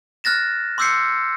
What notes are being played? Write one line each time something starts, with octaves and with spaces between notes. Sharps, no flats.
F6 F#6 A6 A#6 E7
C6 D6 E6 G6 C7 C#7